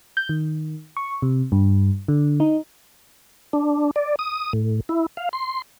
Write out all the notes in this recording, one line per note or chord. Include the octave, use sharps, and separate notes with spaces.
G6
D#3
C#6
C3
G2
D3
D#4
D4
D5
D#6
A2
E4
F5
C6